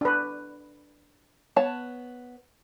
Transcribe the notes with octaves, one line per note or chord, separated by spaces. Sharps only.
D4 B4
B3 C#5 A5